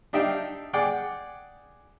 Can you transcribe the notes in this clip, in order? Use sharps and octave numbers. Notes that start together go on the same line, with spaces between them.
D4 D#4 E5 F5 G5
G#4 D5 F#5 G5